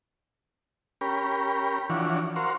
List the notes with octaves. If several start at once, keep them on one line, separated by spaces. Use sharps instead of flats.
C#4 G4 A#4 B5
E3 F3 D4 F#4 C#5
F#4 A#4 C5 F5 C6 C#6